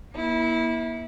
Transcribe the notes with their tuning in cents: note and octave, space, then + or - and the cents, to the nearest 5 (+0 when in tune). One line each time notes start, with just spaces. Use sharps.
A#3 +40 E4 -20